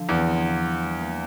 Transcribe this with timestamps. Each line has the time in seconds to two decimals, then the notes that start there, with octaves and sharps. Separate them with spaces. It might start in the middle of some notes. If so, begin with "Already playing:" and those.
Already playing: D3 F3 D4
0.09 E2 C4
0.27 C4
0.46 F4
0.63 G3
0.82 G3
1.00 A#3